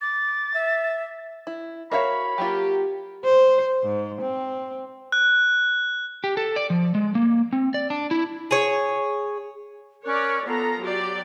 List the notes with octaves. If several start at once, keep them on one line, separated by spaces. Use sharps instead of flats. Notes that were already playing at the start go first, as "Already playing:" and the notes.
D6 A6
E5
E4
F#4 A#4 C#5 E5 F5 B5
F#3 A#3 F4 G4
C5
G#2
C4
F#6
G4
A4
D5
F3
G#3
A#3
C4
D5
D4
E4
G#4 C#5
C#4 A#4 C#5 D5 F#6
B3 F4 A4 A#5
F#3 G4 D5